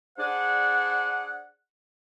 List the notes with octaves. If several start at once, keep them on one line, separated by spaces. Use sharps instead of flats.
D4 G#4 C5 D5 F#5